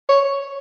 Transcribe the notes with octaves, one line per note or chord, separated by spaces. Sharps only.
C#5